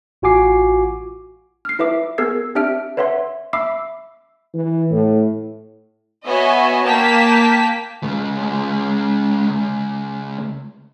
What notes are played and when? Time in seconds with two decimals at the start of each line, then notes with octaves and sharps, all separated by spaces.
0.22 A1 F4 F#4 G#5 D6 C7
1.65 F6 C7
1.79 E4 B4 E5 D6
2.18 B3 G#4 A#4 E6 G#6 C7
2.55 C4 D4 G4 E5 F6 D7
2.97 B4 C#5 E5 F#5 C6
3.53 E5 B5 D6 E6 C7
4.54 E3
4.90 A2
6.26 B3 F#4 C#5 D#5 E5 G#5
6.84 A#3 G5 A5 B6
8.03 C#2 G#3